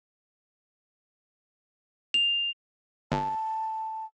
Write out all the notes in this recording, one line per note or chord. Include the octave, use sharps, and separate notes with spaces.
F7
G1 A5